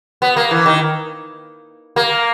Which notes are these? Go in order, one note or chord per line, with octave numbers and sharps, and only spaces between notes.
B3
A#3
E3
D#3
A#3